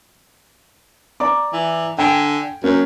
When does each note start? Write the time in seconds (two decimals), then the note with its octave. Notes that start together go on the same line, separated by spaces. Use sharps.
1.20 D5 A#5 D6
1.53 E3
1.99 D3 G5 G#5 D7
2.64 F#2 A#3 C#4 A#4